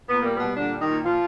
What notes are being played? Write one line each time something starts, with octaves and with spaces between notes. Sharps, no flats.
A#2 B3
G3 A#3
B2 G3 B3
A#2 D3 D4
G3
D#3 D#4
A#2
A#2 F3 F4